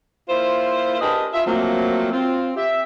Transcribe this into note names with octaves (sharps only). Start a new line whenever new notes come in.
A#3 E4 F4 C5
D4 G4 G#4 A#4 B4 D#5
F4 E5
F3 F#3 A3 A#3 C4
C4 F4
G4 E5